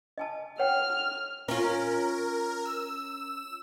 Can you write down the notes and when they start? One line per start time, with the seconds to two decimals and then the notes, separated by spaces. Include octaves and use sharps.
0.18 D#5 G#5 A5
0.59 C#5 F#5 G5 F6
1.48 C#4 F4 A#4
2.65 E6